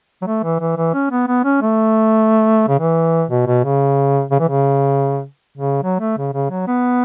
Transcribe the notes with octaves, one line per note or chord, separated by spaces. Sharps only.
F#3
A3
E3
E3
E3
C#4
B3
B3
C#4
A3
C#3
E3
B2
B2
C#3
C#3
E3
C#3
C#3
F#3
A3
C#3
C#3
F#3
B3